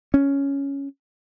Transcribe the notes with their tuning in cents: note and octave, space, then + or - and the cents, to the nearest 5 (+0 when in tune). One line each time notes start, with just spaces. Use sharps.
C#4 +5